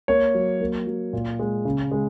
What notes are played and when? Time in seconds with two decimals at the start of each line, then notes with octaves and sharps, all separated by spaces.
0.08 A#3 C#5
0.35 F#3
0.61 A#3
0.87 F#3
1.13 A#2
1.39 G#3
1.65 C#3
1.91 G#3